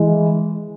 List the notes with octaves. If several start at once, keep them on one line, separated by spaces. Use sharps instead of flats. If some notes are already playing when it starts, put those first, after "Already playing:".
Already playing: E3 G#3